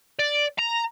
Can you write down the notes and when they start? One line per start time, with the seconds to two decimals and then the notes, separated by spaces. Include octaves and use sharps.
0.19 D5
0.58 A#5